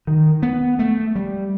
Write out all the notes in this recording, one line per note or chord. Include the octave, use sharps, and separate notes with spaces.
D#3
B3
A3
G3